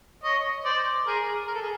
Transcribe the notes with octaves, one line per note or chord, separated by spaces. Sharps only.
C#5 D#5
C5 D5
G#4 A#4
A#4
A4
G#4